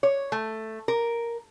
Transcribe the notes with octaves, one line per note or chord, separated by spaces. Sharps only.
C#5
A3
A#4